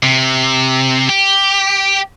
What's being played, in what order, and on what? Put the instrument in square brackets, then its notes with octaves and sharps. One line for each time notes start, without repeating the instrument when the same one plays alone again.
[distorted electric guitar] C3
G4